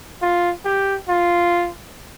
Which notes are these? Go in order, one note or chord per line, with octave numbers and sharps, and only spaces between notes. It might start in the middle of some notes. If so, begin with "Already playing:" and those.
F4
G4
F4